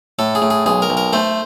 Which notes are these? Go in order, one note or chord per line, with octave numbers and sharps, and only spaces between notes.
A2 A4
G#4
A2
G#4
B1 G#4
A#4
B1
A#4
A3 C5